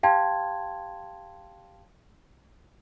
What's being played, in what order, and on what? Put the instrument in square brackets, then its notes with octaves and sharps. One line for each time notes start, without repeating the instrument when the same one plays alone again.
[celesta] G4 F5 G5 A5 C6 G#6